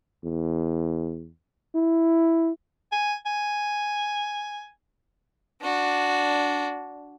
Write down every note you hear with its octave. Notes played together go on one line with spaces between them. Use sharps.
E2
E4
G#5
G#5
D4 F#4